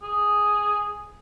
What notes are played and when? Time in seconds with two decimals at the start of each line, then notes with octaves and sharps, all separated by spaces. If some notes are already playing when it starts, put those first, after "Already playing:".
0.02 G#4